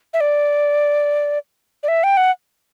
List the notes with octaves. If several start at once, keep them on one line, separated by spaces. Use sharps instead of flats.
E5
D5
D5
E5
G5
F#5